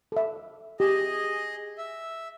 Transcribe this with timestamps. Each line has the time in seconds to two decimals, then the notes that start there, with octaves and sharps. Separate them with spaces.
0.12 A4 E5
0.80 G4 G#4 D#5
1.78 E5